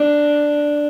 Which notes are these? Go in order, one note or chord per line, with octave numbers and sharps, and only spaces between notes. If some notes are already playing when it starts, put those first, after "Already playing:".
Already playing: D4